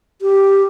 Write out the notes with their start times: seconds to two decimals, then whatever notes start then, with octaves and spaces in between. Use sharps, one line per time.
0.22 G4